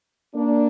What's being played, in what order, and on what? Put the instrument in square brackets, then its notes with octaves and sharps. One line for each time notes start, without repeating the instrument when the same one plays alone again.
[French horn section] A#3 D4